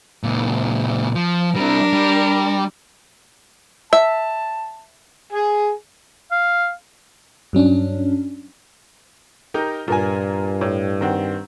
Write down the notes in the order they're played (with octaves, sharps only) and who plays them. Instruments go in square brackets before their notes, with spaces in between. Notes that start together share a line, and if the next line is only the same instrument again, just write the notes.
[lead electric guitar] C#2 A#2
F3
[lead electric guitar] G3 C4 [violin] D4 A#4
[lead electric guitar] G3
[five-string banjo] E5 [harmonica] A5
[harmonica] G#4 G#5
[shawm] F5
[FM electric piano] G2 F#3 C#4 D4
[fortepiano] D#4 G4 A#4
[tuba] G2 [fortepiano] A#2 A#4 G#5
[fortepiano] A2
D#3 C4 F#4